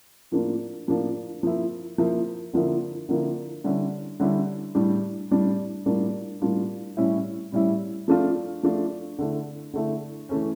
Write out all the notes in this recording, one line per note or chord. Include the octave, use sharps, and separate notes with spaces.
A2 F3 A#3 D4 F4
A2 F3 A#3 D4 F4
F3 A#3 E4
F3 A#3 E4
D3 F3 A#3 E4
D3 F3 A#3 E4
D3 G3 C#4 E4
D3 G3 C#4 E4
A2 G3 D4
A2 G3 D4
A2 G3 A#3 D4 F4
A2 G3 A#3 D4 F4
A2 G3 C#4 E4
A2 G3 C#4 E4
F3 A3 D4 F4
F3 A3 D4 F4
D3 A3 E4
D3 A3 E4
E3 A3 C#4